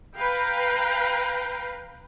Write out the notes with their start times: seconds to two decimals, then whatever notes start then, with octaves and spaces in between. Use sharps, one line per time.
0.17 B4 F5 G5 A#5